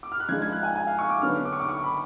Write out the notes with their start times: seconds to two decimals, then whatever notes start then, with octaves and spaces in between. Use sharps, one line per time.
0.03 D6
0.12 F6
0.20 F#6
0.29 F3 G#3 D4 F4 G#6
0.42 G#6
0.52 F#6
0.63 G#5
0.76 G#5
0.87 F5
0.99 C#6
1.10 D6
1.22 D3 F#3 B3 D4 F6
1.45 D6
1.53 C#6
1.60 D6
1.68 C#6
1.84 B5